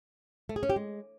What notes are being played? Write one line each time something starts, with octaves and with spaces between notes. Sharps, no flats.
A3
G#4
C#4
G4
G#3